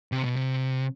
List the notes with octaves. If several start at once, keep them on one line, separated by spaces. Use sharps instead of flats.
C3
B2
C3